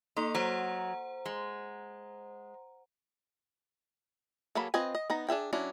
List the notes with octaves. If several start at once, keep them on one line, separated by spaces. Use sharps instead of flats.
A#3 D#4 A4 C6
F#3 C5 F#5 A#5
G#3
F#3 A#3 G#4 A4 B5
C4 F4 B4 D#5 G#5
D#5
B3 D#4 A#5
D4 G#4 E5 G5
F#3 C#4 D4 E4